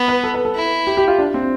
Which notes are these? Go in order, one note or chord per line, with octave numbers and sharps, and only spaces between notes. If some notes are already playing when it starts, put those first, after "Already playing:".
Already playing: B3
B4
A4
B4
A4
E4
G4
G4
F4
D4
C4